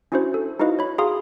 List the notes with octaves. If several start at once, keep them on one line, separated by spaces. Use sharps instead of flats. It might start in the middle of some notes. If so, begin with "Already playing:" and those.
C#4 D4 E4 F#4 B4 C5
A4
D#4 E4 F#4 B4 D#5 F5
C#5 B5
F#4 G#4 F5 A#5 C6 D#6